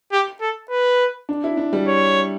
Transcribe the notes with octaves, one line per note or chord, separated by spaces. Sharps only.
G4
A4
B4
D4
E4
D4
G3
C#5